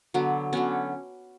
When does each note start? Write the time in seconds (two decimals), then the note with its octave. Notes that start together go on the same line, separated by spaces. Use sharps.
0.14 D3 F#3 B3
0.53 D3 F#3 B3 C#4